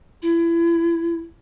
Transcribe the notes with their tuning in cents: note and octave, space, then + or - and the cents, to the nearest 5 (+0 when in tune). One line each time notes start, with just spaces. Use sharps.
E4 +30